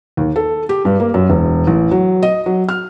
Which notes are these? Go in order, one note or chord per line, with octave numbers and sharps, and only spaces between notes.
D#2
A4
G4
G2
A#3
F#2
E1
A1
F#3
D#5
F#3
F6